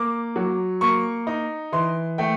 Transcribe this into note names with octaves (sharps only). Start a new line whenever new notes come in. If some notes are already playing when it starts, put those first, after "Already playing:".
Already playing: A#3 D6
F#3
A#3 C#6
D#4
E3 C6
A3 G5